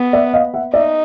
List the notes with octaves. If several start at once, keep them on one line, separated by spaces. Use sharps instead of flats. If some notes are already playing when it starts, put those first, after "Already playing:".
Already playing: B3
D5 E5
D#5 F5
E5 F#5
D#4 D5 E5